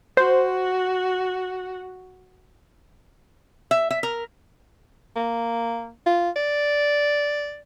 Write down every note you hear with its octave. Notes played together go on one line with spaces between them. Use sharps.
F#4 C5
E5
E5
A#4
A#3
F4
D5